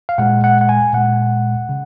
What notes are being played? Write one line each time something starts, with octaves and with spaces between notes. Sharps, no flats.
F5
A#2 G#3 F#5
F#5
F#5
G#5
A#2 G#3 F#5
C#3